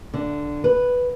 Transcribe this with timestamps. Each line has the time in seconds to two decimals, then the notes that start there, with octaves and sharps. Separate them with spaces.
0.14 D3
0.64 B4